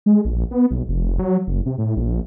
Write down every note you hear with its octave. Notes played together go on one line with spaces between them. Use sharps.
G#3
A#1
B3
B1
F1
F#3
F#1
C3
A2
A#1